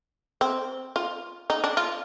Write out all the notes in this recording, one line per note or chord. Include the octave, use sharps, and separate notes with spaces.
C4
F4
D#4
D4
F4